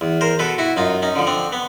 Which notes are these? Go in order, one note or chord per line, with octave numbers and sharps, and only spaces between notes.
E2
A#4 C5
B2 A4 B4
E4 F#4
F#2 D#4 F4
C#4 D#4
D3 F3
C4 D4
B3